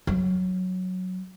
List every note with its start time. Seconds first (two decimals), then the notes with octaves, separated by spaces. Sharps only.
0.07 F#3